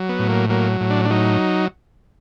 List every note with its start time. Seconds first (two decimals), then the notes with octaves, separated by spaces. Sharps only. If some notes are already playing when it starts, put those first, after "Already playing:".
Already playing: F#3
0.09 B3
0.19 A2
0.29 A#3
0.49 F#3 A#3
0.81 A2
0.90 D4
1.05 D4
1.11 F#3 D#4